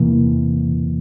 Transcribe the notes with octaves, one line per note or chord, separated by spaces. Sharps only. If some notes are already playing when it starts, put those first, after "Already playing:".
Already playing: E2 C3 E3 A#3